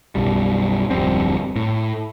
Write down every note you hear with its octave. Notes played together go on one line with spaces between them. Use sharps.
B1 F#2 G3
D1 F2 G3 C4
A2